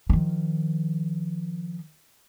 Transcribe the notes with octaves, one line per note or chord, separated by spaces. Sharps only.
D#3 F3